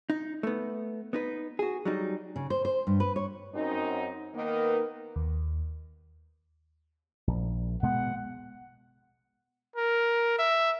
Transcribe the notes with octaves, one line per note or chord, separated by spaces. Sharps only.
D#4
A3 B3
B3 D#4 B4
F#4 G#4
F#3 G3 D#4
C#3
C5
C5
G2
B4
C#5
F#2 C4 D#4
D#3 A#3 B3 D#4 A#4 B4
D#2
A#1
B2 G#3 B3 F#5
A#4
E5